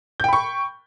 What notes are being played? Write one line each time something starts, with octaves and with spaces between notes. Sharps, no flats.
G5 B5 C#6 G6